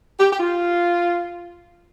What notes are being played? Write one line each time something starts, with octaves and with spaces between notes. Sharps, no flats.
G4
G4
F4